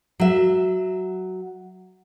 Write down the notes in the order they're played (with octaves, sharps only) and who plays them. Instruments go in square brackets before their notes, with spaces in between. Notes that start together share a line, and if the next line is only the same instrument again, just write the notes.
[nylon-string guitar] F#3 E5